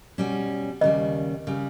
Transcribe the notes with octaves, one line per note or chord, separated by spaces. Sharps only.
B2 G3 C#4
D#2 C#3 G3 D#5
C#3 G3